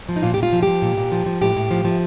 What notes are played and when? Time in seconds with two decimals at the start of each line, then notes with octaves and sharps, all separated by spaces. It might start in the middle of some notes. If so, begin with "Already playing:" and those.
0.09 F3
0.16 D#4
0.23 A#2 F4
0.34 G4
0.38 A#2
0.43 F4
0.53 F3
0.63 F3 G4
0.82 A#2
0.97 A#2
1.12 F3
1.26 F3
1.41 A2 G4
1.56 A2
1.71 F3
1.85 F3